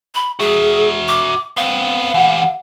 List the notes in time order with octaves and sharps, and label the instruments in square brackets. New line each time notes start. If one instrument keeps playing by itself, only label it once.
[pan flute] B5
[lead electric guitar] F#4 E5 [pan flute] G#4
[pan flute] D6
[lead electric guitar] B3 C4 [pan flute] F5
[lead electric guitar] E3 G4 [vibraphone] F#5